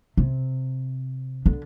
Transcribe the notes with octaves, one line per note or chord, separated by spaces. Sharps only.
C3
D3